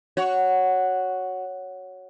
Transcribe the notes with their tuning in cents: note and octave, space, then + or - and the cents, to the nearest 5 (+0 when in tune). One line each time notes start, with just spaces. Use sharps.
F#4 +0 C#5 +0